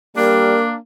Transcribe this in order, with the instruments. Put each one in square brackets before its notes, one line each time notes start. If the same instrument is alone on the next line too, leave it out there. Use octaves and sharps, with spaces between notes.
[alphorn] G3 [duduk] A#3 [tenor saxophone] D4 [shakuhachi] A#4